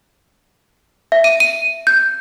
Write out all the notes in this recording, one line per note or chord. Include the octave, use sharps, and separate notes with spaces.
E5
D#7
D#7
G6